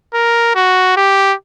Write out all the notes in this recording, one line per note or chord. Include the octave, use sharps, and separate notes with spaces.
A#4
F#4
G4